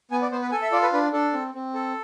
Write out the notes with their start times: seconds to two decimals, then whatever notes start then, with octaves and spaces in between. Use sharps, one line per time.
0.11 B3 G#5
0.22 D5
0.32 B3 C5
0.42 B4
0.51 A4 G#5
0.62 E5
0.72 F4 D5
0.82 B4
0.93 D4 B4
1.13 D4 A4
1.33 C4
1.54 C4
1.74 A4